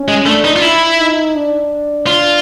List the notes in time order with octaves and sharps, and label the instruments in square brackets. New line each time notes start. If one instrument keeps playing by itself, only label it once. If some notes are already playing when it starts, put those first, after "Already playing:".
Already playing: [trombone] C#4
[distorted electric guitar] G#3
[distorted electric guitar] A3 [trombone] D4
[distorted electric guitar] D#4
F4
E4
[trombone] D#4
D4
[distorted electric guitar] F4